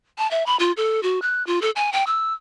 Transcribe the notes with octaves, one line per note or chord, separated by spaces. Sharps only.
A5
E5
B5
F4
A4
F#4
F#6
F4
A4
G#5
G5
E6